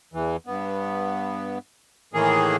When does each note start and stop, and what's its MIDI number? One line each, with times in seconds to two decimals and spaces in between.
0.14 0.36 40
0.14 0.36 52
0.47 1.58 43
0.47 1.58 59
2.14 2.56 45
2.14 2.56 51
2.14 2.56 52
2.14 2.56 58
2.14 2.56 68